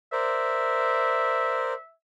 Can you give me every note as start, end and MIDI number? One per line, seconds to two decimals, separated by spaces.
0.13 1.73 70
0.13 1.73 72
0.13 1.73 74
0.13 1.93 76